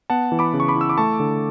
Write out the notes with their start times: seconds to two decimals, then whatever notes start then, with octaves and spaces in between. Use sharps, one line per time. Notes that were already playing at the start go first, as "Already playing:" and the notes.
0.10 B3 F#5 A5
0.32 E3
0.39 B5 D6
0.54 C#3
0.60 C#6
0.68 B5 D6
0.75 E4
0.81 E6
0.89 D6
0.98 A3 A5 C#6
1.20 D3